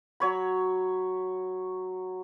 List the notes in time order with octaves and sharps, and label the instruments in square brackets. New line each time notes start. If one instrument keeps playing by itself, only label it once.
[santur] F#3 C#5 B5